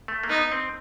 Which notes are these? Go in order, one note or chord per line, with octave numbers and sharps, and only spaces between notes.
A3
A#3
B3 D#4
C4